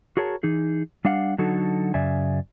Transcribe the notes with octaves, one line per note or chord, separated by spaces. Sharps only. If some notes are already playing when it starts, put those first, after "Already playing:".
F#4 G#4 A#4 C#5 A5
E3 D#4 G#4
G3 D4 F5 F#5
D3 F#3 D#4 F#4 A4
F#2 C#3 D5 E5 G#5